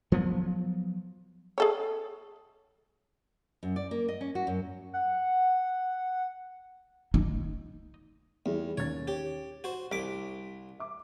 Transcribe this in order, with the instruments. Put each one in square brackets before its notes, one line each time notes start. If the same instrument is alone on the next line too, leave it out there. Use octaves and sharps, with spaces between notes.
[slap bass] F3 F#3 B3
[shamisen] G#4 A4 C#5
[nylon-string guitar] F#2
D5
A#3
D#5
C#4
F#4
F#2
[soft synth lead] F#5
[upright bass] D#4
[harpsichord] E2 [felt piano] G3 E4 G#4
[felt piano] D#2 C#4 A6 [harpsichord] C#5
[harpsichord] G4 [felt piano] C#5
[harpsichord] F#4 C5
[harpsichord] C2 D6 [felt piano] B6
[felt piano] E5 D6